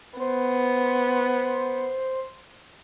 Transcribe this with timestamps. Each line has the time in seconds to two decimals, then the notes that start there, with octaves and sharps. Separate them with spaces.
0.19 B3 C5